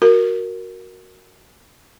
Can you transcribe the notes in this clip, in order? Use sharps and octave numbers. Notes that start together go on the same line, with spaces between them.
F#4 A#4